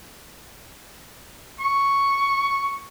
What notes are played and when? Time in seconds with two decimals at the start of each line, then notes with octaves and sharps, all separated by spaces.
1.60 C#6